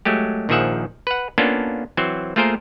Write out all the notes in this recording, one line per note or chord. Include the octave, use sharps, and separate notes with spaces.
F#3 G#3 A3 G4
A#1 D#3 F3 G#4 E5 F#5
B4 F#5
A#3 B3 C#4 D4 F4 A4
E3 F#3 C4 C5
A3 A#3 F4 G#4 A#4 C5